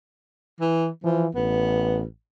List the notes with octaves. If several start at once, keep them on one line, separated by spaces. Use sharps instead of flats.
E3
E3 F3
A1 B3